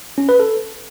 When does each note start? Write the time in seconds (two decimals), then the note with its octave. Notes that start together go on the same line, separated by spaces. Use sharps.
0.18 C#4
0.29 B4
0.40 A4